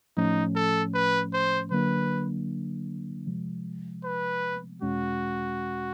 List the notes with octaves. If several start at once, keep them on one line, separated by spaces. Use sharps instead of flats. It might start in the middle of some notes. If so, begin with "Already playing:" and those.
A2 F3 A3 C#4 D#4
A4
B4
C5
D3 F#3 A#3 D4 B4
C3 F3 G#3
B4
E2 B2 G#3 C#4 F#4